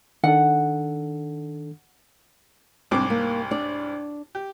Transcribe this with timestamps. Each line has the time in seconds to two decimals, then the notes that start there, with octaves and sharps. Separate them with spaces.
0.24 D#3 D4 A4 F#5
2.91 C2 G#2 C4 D4 D6
3.10 A#3
3.51 D4 D5
4.35 G4